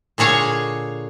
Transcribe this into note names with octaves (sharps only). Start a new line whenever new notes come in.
A#2 D3 G#4 C#5 F5